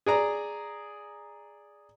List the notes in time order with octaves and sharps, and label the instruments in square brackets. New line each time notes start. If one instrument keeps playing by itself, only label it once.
[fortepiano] G#4 D5 A#5